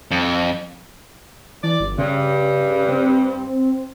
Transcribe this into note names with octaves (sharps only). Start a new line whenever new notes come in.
F2
E3 D5
G1
G2 C#3
C4